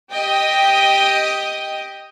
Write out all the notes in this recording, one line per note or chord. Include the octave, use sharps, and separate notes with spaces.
G4 D#5 G5 D#6